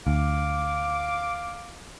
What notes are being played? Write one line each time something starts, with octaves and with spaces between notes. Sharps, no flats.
D2 F5 D6